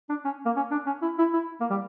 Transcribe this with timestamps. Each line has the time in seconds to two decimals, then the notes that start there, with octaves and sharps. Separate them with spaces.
0.09 D4
0.25 C#4
0.46 A#3
0.56 C#4
0.71 D4
0.87 C#4
1.02 E4
1.19 E4
1.34 E4
1.60 A#3
1.70 G3